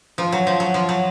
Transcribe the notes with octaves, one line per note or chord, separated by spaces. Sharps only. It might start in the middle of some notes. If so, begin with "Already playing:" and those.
F3
F#3
F3
F#3
F3
F#3